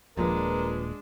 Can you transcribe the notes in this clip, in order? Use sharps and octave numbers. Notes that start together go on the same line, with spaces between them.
D#1 A#2 F3 G#3 D4 A#4 B4